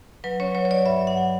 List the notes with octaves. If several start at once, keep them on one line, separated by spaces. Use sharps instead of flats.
F#3 B4
C#4 C#5
F#3 C#5
C#5
F#3 D5
G2 E5
F#3
F#5
F#3